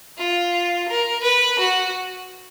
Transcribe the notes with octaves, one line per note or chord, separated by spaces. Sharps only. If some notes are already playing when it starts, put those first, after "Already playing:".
F4
A#4
B4
F#4